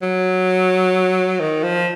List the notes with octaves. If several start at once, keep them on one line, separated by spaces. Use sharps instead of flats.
F#3
D#3
F3